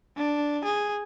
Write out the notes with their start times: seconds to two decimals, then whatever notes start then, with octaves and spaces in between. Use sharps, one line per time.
0.17 D4
0.64 G#4